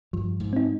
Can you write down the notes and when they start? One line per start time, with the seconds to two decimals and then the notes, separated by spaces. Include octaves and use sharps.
0.13 G2 F3
0.40 G#2
0.53 C4 D#4